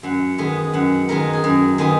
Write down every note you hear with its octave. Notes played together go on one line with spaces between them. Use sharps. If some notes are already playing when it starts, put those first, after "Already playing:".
F#2 F#5
D#3 G#3 B3
F#2 F#5
D#3 G#3 B3 A#4
G#4
F#2 A#4
D#3 G#3 B3 G#4